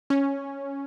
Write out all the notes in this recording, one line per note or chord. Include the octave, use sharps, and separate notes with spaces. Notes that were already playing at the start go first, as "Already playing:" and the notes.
C#4